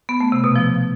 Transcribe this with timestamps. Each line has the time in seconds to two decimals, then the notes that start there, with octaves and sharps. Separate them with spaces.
0.09 B3
0.21 A3
0.32 C3
0.44 B2
0.56 F3